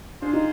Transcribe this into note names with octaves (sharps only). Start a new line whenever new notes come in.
D4 F4 G#4 C5
D#4